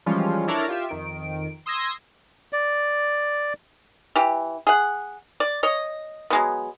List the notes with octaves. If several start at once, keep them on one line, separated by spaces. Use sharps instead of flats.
E3 F3 G3 G#3 C#4 F4
D4 E4 A4 A#4 C#5 D5
F4 G4 E5
F2 D#3 D7
C6 D#6 E6 G#6 A#6
D5
E3 G4
G#4 F#5
D5
C#5 D#5
F#3 G#3 B3